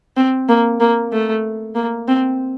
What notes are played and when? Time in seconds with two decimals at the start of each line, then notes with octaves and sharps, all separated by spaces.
0.17 C4
0.49 A#3
0.80 A#3
1.12 A3
1.75 A#3
2.08 C4